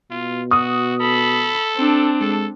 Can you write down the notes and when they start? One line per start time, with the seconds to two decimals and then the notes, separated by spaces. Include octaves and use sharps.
0.11 B2 F4
0.51 F#4 D#6
1.01 A4 B5
1.77 C4 D4
2.21 G#3 A4